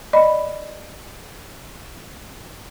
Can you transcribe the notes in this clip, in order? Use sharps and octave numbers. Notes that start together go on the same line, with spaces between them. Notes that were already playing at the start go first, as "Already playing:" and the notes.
D5 D#5 B5